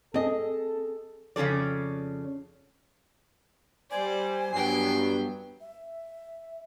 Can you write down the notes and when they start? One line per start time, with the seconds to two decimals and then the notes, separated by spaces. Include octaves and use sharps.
0.14 C4 G#4 A4 D#5
1.36 F2 C#3 C#4 A4 D5
3.91 G3 C5 D5 G#5
4.54 G2 F#3 B3 G5 C7
5.61 E5